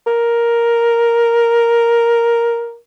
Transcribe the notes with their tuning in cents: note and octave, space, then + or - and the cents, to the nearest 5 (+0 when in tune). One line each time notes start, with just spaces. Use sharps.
A#4 +5